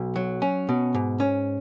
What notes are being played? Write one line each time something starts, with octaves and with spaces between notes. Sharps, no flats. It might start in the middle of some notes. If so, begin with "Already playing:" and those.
Already playing: B1
F#3
C#4
B2
G#2
C#4